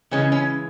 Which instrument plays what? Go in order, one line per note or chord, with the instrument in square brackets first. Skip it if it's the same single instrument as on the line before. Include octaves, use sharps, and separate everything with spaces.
[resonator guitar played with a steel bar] C#3 E3 G#3 C#4
C#4